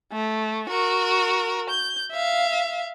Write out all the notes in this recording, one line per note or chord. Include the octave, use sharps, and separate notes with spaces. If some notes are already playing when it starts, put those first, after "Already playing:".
A3
F#4 A#4
G6
E5 F5